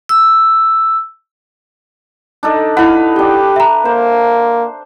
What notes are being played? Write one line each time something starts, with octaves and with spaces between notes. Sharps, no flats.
E6
D4 D#4 A4
E4 B4 F5 F#5
D4 G4 G5
E5 A#5
A#3 C5